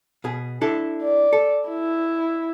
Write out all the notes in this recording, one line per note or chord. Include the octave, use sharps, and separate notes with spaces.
B2 G#4
D4 E4 A4
D5
A4
E4